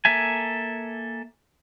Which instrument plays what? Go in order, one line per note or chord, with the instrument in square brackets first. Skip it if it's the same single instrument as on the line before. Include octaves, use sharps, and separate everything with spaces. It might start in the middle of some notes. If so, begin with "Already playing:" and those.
[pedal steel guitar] A#3 A4 E5 G#5